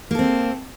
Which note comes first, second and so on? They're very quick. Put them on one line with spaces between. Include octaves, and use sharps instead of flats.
A#3 A4 C4